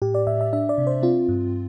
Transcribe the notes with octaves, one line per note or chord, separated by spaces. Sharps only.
A2 G4
D5
A2 E5
E5
D4 E5
D5
C3
C5
C4 F4
G2